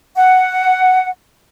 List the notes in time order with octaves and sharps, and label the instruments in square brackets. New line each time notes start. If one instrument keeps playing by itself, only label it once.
[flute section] F#5